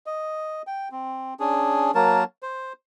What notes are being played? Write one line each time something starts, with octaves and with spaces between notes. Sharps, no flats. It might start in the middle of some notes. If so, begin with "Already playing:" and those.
D#5
G5
C4
C#4 D4 G#4
F#3 A#3 A#4 A5
C5